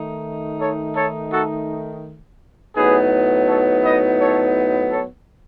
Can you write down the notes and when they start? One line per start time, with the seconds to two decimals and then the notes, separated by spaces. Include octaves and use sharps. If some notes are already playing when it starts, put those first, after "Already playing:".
Already playing: D#3 A3 D#4
0.60 A4 C#5
0.96 A4 C#5
1.31 F#4 A4
2.75 A2 F#3 B3 D#4 G#4 B4
3.48 A4 C#5
3.83 B4 D#5
4.19 A4 C#5
4.92 A4 C#5